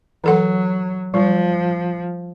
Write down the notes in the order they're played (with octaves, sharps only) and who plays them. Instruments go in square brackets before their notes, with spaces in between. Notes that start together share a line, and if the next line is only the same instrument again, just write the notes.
[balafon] E3 A4 F#5 [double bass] F#3
[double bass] F3 [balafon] G3